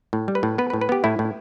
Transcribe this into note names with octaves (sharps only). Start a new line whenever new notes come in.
A2
G3
B4
A2
B3 B4
B4
A2
B4
B3 G4
A2 E4
A2